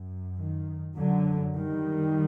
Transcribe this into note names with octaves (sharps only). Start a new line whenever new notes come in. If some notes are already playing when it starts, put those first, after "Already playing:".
Already playing: F#2
D#3
F#2 D3 F#3
D#3 G3